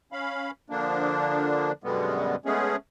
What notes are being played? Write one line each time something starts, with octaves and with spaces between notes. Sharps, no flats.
C#4 F5 B5
D3 F3 A#3 D4
F#2 B2 D3 G3 G#3 B3
G#3 A3 B3 C#4 G#4